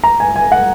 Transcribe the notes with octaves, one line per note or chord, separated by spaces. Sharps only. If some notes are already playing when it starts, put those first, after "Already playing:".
A#5
G#5
G#5
F#5